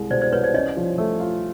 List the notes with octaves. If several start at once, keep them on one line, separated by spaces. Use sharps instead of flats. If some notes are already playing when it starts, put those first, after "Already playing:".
Already playing: C2 G#3
B2 C5 D5
C5 D5
C2 B4 C#5
C5 D5
C#4 C#5 D#5
F3
A3
F4